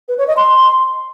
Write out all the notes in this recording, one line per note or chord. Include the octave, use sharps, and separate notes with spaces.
B4
C#5
D#5
C6